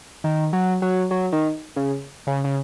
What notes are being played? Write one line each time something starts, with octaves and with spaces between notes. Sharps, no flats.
D#3
F#3
F#3
F#3
D#3
C#3
C#3
C#3